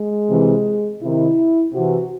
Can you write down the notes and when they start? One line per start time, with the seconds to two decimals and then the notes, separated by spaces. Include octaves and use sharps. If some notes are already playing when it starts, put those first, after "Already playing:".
Already playing: G#3
0.29 C3 E3
1.02 C3 D#3 E4
1.73 C3 E3 F#4